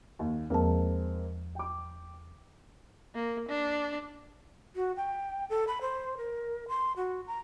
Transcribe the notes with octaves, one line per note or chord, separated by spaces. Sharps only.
D#2
E2 F3 G#3 A#3 C4 A5
G5 D6
A#3
D4
F#4
G5
A4
B5
C5
A#4
C6
F#4
A#5